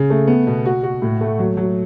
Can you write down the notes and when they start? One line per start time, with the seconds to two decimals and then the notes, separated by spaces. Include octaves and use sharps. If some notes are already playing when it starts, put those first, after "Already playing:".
Already playing: C#3
0.10 A3
0.27 B3
0.47 B2
0.65 F#4
0.83 F#4
1.02 A2
1.21 A3
1.39 F#3
1.57 F#3